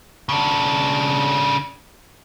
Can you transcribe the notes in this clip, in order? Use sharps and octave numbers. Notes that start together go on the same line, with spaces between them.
C#3 D4